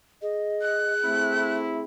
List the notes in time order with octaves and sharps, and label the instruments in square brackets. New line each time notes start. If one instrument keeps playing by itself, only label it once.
[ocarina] G#4 [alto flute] D#5
[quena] F#6
[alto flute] A3 [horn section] C4 E4